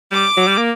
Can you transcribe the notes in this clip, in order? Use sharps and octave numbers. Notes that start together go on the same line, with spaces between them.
G3 D6
F#3
G3
A#3